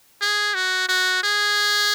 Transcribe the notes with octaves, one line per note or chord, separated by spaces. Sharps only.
G#4
F#4
F#4
G#4